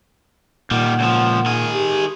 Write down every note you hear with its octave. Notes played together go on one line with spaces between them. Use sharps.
A#2 D#3 G3 F#5
C#2 F3
D#3 G#4
G4